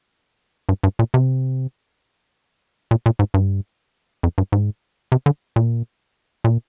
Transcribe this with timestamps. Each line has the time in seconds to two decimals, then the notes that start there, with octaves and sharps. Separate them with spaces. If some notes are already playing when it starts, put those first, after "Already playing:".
0.69 G2
0.83 G2
0.99 A#2
1.14 C3
2.91 A#2
3.06 A#2
3.19 G#2
3.34 G2
4.23 F2
4.38 G2
4.52 G#2
5.12 C3
5.26 D3
5.56 A#2
6.44 A#2